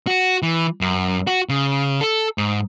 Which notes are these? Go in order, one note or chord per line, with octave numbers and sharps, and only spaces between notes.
F#4
E3
F#2
F#4
C#3
A4
G#2